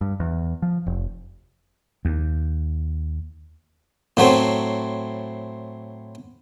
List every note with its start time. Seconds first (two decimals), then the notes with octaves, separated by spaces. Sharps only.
0.01 G2
0.20 E2
0.62 F3
0.86 F1
2.05 D#2
4.17 A2 F#3 A3 C4